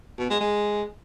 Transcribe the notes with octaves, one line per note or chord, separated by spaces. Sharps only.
B2
G#3
G#3